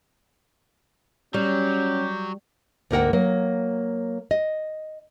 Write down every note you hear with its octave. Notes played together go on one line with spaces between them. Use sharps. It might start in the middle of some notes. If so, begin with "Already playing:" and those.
F#3 G3 C#4 G4
D2 G#2 A#3 A#4 F#5 G5
F#3 A#3
D#5